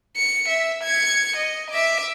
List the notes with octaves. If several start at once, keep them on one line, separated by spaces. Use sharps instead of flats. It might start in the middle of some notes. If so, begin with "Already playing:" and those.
C#7
E5
G#6 C#7
D#5
E5 D6